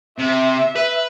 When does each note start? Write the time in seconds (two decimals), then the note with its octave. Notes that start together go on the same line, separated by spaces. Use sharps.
0.18 C3 E5
0.76 B4